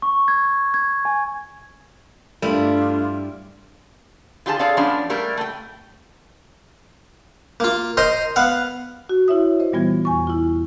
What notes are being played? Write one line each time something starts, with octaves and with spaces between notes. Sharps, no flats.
C#6
G#6
G#6
G#5
G2 G3 A3 D4 E4 F4
D3 F4 G4 G#4 A#4 A5
G#4 A4 C#5 D5 F5
F3 G3 B3 C#4 D4 F5
G3 A3 A#3 A#4
A3 G5
A#3 F4
A#4 C5 D#5 A#5 C6
B3 F5 F#5
F#4
E4 C#5 E5 D#6
C5 D#5
A#2 E3 G3 B3 F4 G#6
E2 G#5 C#6
E4 F4